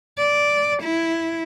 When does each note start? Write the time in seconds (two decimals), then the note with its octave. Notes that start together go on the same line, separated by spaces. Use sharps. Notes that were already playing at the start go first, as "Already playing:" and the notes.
0.18 D5
0.83 E4